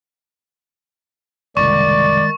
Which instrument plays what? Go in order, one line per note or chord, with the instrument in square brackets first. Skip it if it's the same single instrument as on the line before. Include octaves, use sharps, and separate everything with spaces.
[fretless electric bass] F#1 C2 [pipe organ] D#3 G#3 A6 [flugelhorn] D5 [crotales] C#6